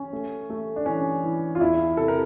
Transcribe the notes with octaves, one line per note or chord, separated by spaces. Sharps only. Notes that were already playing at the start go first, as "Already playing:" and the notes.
Already playing: C#4
A3
A3
D4
E3 C#4
E3
F4
E2 E4
C3 A4
A#4